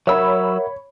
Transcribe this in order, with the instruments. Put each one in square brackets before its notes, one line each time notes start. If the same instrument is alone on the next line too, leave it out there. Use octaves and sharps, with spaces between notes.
[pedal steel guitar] F#3 E6 [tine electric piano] A#4 E5 F#5 [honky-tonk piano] C#5 B5